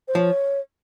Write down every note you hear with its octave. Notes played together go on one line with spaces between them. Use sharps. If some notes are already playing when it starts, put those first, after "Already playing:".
C5
F3 C#5